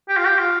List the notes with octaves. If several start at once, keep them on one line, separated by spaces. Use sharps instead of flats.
G4
F4
G4
F4